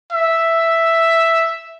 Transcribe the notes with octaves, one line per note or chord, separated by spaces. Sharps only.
E5